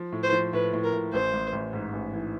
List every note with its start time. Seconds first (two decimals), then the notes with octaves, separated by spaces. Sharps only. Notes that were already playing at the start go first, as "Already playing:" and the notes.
Already playing: F3
0.12 A2
0.23 C5
0.33 F3
0.53 A2 B4
0.73 A2
0.83 A#4
0.93 A2
1.12 A1 C5
1.33 A1
1.53 A1
1.73 G#2
1.93 A1
2.14 E3